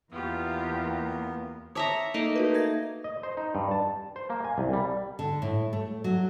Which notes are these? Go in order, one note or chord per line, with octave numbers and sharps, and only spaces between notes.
E2 A#3 B3 F4 G4
C#5 E5 A5 A#5 D6 D#6
A3 A#3 D#4
F#4 A#4 B4
E5 G#6 A#6
D#5
C5
D#4
G2
A5
C5
A#3
G#5
C2
G3
D3
A2
A3
F#3